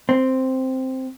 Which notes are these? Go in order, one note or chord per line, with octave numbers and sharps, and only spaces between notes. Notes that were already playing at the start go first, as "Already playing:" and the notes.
C4